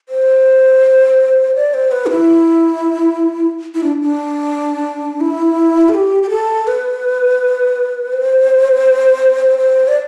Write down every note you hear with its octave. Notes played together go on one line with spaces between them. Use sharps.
C5
D5
C5
B4
D4
E4
E4
D4
D4
E4
A4
G4
G4
A4
B4
C5
C5
D5